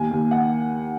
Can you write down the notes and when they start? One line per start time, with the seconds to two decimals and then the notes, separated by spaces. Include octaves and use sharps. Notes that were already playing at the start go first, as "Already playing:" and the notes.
Already playing: D#2 G#5
0.11 D#2
0.31 F#5